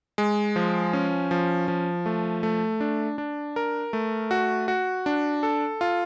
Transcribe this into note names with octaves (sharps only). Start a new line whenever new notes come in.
G#3
F3
C#4
F3
F3
A3
A3
D4
D4
A#4
A3
F#4
F#4
D4
A4
F4